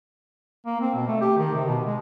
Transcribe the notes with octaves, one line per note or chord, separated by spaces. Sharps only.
A#3
C4
B2
A3
G4
D#3
C3
B2
G#3